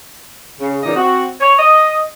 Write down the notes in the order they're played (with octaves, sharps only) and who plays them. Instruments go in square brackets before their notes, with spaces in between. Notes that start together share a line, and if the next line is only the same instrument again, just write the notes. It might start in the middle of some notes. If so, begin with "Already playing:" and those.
[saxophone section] C#3
A#2 C#3 E3 D#4 D5 D#5
C4 F#4
C#5
D#5